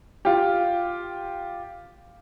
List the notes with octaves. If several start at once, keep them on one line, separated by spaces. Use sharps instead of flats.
F4 G4